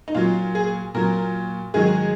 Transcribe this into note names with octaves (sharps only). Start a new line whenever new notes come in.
D#4
A#2 F#3 F4
G#4
A#2 F#3 A#4
G#2 D#3 F#3 G#4